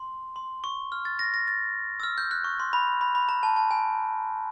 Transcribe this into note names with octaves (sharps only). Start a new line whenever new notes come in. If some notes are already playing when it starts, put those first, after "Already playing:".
Already playing: C6
C6
C#6
F6
A6
A#6
A#6
A6
E6
F6
G6
F#6
C#6
C6
B5
B5
B5
A#5
A5
A5
G#5